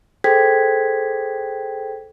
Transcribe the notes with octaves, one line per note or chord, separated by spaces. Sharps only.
G#4 A4 C5 G5 G#6 B6